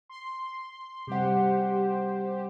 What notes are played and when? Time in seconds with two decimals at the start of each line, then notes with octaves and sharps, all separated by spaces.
0.09 C6
1.07 C3 G3 G4 C5 F#5